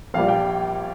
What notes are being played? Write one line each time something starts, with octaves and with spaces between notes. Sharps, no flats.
A#1 A#2 G3 F5
G5